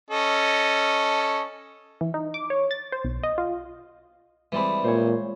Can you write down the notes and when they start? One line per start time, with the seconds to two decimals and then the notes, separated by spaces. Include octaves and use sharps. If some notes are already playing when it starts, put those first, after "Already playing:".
0.11 C#4 A4 D#5
2.01 E3
2.14 D#4
2.34 D6
2.50 C#5
2.71 A6
2.92 C5
3.05 B1
3.23 D#5
3.38 F4
4.52 E3 G3 G#3 C4 D5 B5
4.84 A#2 C5 C#5